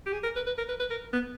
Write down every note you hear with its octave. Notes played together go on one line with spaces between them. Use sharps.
G4
G#4
A#4
B4
B4
A#4
B4
B4
A#4
B3